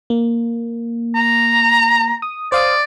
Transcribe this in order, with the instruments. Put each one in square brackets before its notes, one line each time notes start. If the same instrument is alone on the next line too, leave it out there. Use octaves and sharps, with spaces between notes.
[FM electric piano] A#3
[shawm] A#5
[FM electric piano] D#6
[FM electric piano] C5 F5 D#6 [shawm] D5